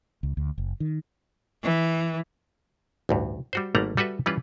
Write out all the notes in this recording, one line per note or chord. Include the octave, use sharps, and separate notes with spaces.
C#2
D2
F#1
D#3
E3
A1 D2 G2
G3 F#4 C5
G#1 G3 A3 A#3 F#5 A#5
G3 F#4 A4 B4 E5
E3 G3 C#4 F4 B4